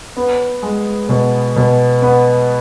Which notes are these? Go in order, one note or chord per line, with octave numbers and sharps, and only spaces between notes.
B3
G#3
B2
B2
B3